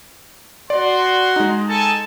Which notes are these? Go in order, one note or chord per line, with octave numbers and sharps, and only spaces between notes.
F#4 D5 C6
G#3 D#4
A4 G#5 A5